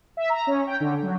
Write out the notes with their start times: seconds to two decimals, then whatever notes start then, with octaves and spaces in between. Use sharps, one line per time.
0.17 E5
0.30 A#5
0.47 C#4
0.67 G5
0.80 D3
1.03 F#3